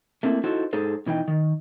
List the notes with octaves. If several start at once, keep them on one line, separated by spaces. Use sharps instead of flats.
A3 A#3 C4 E4
D#4 E4 F#4 A4 C5
G#2 D#4 G#4 A4 C5
B2 E3 D#4 G5
D#3